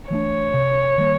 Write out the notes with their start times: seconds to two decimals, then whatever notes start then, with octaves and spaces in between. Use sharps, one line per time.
0.10 E3 A3 D4 C#5
0.54 C3
0.98 D#3 G3 A#3